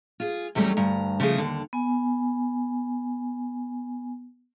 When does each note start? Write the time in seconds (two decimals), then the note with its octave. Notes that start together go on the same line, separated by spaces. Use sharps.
0.20 F4 G#4
0.55 E2 F#3 G3 A3 C#4
0.77 D2 G2 A#5
1.20 C#3 F3 A3 G#4
1.38 D#2 D3
1.73 B3 G#5